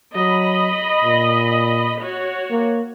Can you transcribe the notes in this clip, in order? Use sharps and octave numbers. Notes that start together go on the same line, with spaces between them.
F#3 D#5 B5
A#2
F#4 C#5
A#3